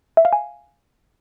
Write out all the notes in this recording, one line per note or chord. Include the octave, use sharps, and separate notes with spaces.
E5
F5
G#5